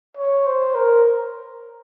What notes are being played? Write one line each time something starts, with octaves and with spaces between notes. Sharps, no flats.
C#5
C5
A#4